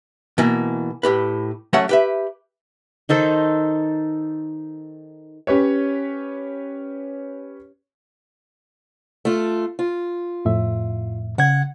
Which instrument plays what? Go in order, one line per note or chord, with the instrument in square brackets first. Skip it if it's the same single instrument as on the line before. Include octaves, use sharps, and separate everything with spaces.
[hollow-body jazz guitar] B2 E3 A#3
A2 G4 B4
F#3 A3 C#4 C#5 E5 F#5
G4 B4 E5
[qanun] D#3 D#4 A4 C5
[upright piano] C#4 G4 B4 C#5
[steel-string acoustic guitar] A3 F4
F4
[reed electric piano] F2 A2 E5
[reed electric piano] C#3 G#6 [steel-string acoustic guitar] F#5